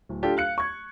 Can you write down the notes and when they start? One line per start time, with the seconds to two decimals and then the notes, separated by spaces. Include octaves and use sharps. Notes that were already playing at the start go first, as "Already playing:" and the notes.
0.09 D1
0.23 D4 F4 G4 A4
0.37 F5 F#6 C#7
0.58 C#6 G#6